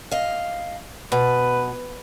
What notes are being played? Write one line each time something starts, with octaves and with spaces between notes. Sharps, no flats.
D#5 F5
B2 B4